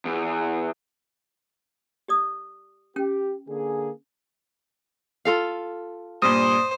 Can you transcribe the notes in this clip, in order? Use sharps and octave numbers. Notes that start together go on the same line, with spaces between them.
E2
G4 D5 D#6
C#4 G4 G5
D3 A#3 G#4
F4 A4 F5
G2 A#2 C5 D#6